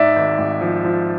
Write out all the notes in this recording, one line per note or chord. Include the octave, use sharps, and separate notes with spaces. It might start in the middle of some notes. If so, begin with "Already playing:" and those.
Already playing: G#2 D5 E5
G#1
G#1
F3
F3